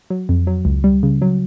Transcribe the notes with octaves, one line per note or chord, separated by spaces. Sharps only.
F#3
F2
F#3
C#2
G3
C#3
F#3